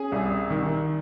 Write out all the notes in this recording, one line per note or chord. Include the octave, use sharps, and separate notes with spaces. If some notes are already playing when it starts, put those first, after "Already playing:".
Already playing: C#4 G#4 G#5
C2
D#3